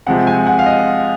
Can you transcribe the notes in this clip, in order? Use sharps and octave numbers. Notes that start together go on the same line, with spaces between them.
C3 F3 G#3 C4 F#5
G#5
F#5
F5
D#5